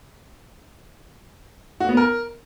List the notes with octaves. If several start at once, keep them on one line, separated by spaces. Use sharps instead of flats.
F#4
B3
A#4